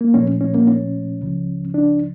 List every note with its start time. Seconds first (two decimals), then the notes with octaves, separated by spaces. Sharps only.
0.01 A#3
0.14 A#2 F3 A3 C#4
0.41 C#4
0.54 A#3
0.68 C#4
1.21 C#2 C#3 F3
1.74 D4